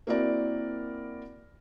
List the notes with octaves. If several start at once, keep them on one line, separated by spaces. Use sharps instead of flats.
A#3 C4 E4 F#4 A#4 D5